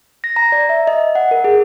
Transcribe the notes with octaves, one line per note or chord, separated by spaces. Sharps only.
A#6
A#5
D5
E5
D#5
F#5
A#4
G#4